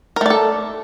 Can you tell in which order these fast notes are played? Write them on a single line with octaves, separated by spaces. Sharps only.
A#4 A3 D5 A4